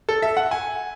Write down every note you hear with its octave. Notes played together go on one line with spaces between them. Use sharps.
A4
E5
F#5
G#5